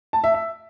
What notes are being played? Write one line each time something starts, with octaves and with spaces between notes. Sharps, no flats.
A5
E5
E5